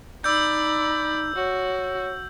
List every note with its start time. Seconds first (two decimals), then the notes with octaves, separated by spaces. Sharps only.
0.24 D#4 D5 B5 E6 G6
1.36 F#4 C#5